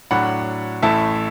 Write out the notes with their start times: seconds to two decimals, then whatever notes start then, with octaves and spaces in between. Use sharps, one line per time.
0.11 A2 F#3 D4 F#5 B5
0.82 A1 A2 A3 E4 E5 A5